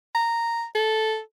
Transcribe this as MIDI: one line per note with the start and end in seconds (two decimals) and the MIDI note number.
0.15 0.65 82
0.75 1.20 69